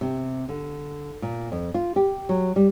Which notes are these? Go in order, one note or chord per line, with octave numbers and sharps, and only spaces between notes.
C3
D3
A#2
F2
F4
G4
F#3
G3